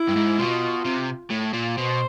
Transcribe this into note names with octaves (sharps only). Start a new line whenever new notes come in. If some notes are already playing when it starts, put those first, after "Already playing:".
Already playing: E4
G2
G#2
B2 F4
C3
A2
A#2
B2 C5